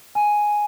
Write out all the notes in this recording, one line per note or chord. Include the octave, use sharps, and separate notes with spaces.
G#5